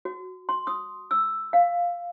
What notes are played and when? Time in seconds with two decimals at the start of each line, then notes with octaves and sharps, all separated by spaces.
0.05 F#4
0.49 C6
0.67 D#6
1.11 E6
1.53 F5